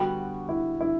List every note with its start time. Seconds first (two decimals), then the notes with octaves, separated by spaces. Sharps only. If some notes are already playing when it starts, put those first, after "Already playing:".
Already playing: D3 G3 B3 F#4
0.49 E4
0.80 E4